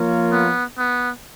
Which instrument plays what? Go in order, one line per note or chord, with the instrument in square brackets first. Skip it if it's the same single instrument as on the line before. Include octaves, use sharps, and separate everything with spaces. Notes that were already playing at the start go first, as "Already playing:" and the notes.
Already playing: [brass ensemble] F3 A#3 F4 A#4 C#5
[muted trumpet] B3
B3